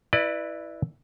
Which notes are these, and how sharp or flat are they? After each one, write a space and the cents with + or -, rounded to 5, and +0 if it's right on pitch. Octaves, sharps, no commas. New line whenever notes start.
E4 +0 B4 -5 D5 +30